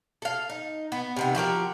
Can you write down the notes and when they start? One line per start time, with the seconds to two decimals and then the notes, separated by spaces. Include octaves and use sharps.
0.22 A4 F5
0.50 D#4
0.92 B3
1.16 C3 D#3 B3
1.35 F3 F#4 G4 A#4